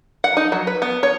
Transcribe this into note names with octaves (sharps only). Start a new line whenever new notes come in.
F#5
D#4
F#3
B4
B3
C#5